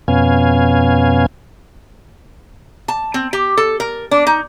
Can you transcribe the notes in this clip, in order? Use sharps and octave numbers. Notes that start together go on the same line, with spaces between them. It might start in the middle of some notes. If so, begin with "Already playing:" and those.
F2 B2 B3 C#4 F5 G#5
A5
C4
G4
A4
A#4
D4
D#4